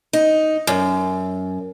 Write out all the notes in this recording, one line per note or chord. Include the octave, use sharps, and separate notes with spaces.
D#4
F#2